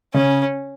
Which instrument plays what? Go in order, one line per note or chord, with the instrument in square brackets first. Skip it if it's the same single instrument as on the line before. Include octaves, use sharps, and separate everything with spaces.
[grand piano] C#3 [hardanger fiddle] C#4